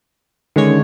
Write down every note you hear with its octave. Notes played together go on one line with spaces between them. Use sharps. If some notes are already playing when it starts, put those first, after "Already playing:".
D3 D#3 G#3 C#4 C#5